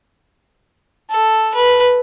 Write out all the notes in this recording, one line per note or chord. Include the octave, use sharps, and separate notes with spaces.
A4
B4